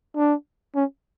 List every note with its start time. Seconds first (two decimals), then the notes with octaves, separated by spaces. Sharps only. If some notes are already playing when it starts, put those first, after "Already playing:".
0.16 D4
0.75 C#4